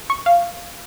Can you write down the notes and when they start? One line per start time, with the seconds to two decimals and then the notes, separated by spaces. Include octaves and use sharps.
0.10 C#6
0.26 F5